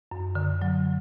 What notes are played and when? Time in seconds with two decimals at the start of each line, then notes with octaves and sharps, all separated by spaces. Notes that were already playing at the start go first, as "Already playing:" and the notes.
0.11 F#2
0.35 D3
0.62 F#3